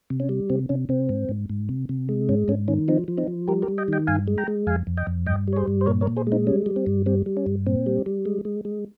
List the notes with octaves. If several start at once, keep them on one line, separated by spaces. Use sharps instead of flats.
C3
C#4
G3
C3 C4
C3 C#4
C3 C4
G#2
G#2
G#2
C3
C3
G#3
G#2 C#4
G#2 C#4
D#3 C#4
F3 C4 D#4
F3
C4 D#4
F3
G3 G4 A#4
G4 A#4
G3
D#5 G5
D#3 D#5 G5
G2 F5 G#5
G#3
G5 A#5
G#3
F2 F5 G#5
F2
D#5 G5
F2
G2 D#5 G5
G3
C#5
G#4 C5
G2
C5
A#2 A#4 C#5
A#4 C#5
A#2
G#4 C5
G#3
C4 D#4
G3 C#4
G3
C4
G2
G3 C4
G3
C#4
G2
A#2 C4
G3
G3
G#3
G#3
G#3